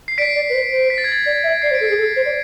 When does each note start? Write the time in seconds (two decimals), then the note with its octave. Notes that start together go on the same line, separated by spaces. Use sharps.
0.08 C7
0.18 D5 B6 D7
0.35 D5
0.50 B4
0.54 C5
0.71 C5
0.90 B6
0.98 A6
1.04 G#6
1.12 A6
1.26 D5
1.44 E5
1.62 D5 C7
1.71 C5
1.75 B6 D7
1.81 A4
1.87 G#4 C7
1.99 A4
2.16 C5
2.26 D5